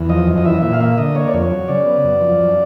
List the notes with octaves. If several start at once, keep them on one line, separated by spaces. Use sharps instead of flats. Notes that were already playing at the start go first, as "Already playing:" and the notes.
Already playing: E2
F3 D#5
F#2
D#5
E3 E5
A#2 E5
F5
A#3 E5
D3 D#5
A#3 C#5
D5
F2 C#5
F#3
C#3 D5
B3
F#2
F3
F#2